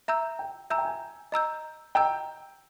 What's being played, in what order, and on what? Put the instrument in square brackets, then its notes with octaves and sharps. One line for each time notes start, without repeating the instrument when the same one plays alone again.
[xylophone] E5 A#5 E6 G6
[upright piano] G5
[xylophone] E5 A#5 E6 G6 [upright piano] G#5
[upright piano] G5
G#5
[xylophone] D#5 A#5 E6 G6
[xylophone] D#5 A#5 E6 G6 [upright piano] G5